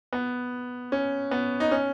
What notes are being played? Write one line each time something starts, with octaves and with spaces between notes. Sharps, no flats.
B3
C#4
B3
D#4
C#4